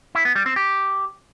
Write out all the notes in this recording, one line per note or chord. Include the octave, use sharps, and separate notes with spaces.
E4
B3
G3
C4
G4